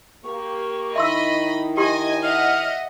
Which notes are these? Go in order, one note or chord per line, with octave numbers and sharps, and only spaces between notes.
A#3 G4 C#6
D#3 D#4 E4 D#5 E5 B5 C6 E6
G4 D#5 G#5 C6
D#5 E5 F#5 F6